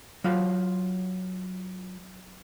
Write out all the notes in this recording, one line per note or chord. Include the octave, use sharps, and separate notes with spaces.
F#3 F4 F5 B5